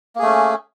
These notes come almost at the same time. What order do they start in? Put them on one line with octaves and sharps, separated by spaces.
A#3 G#4 A3 C#4